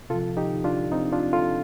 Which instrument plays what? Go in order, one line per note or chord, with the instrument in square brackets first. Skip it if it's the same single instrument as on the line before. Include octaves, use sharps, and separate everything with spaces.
[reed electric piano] C3 F4 A4
F3
D#4 G4
D4 F4
C4 D#4
D4 F4
F4 A4